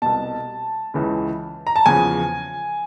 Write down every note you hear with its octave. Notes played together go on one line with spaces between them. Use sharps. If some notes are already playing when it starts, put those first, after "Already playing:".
C2 B2 A5
C#2 C#3 E3
A#5
A5
E2 C#3 F3 G#5